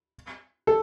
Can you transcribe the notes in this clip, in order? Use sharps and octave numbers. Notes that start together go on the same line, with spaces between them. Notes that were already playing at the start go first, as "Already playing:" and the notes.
A4